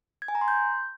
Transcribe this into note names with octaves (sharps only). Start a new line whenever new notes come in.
G#6
G#5
A#5
C6
G6